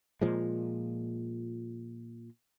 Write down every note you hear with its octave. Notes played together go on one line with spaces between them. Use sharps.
A#2 F3 G#3